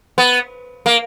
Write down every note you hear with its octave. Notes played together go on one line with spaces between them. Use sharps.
B3
A#3